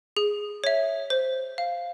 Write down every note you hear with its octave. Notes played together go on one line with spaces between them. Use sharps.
G#4
C#5 E5
C5
F5